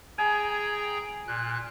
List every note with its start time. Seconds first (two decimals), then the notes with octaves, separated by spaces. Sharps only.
0.18 G#4 G5 G#5 A#5
1.27 A#2 F#6